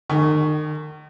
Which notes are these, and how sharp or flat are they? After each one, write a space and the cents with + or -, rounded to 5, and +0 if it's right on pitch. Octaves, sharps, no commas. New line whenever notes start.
D#3 -35 G#5 +0 C#6 +0